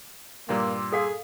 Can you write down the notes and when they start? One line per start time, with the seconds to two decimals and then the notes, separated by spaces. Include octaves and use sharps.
0.49 G2 A#2 A#3 C6 D6 E6
0.92 G#4 A4 F5